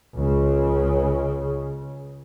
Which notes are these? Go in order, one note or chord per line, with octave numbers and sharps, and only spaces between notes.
C#2 C#3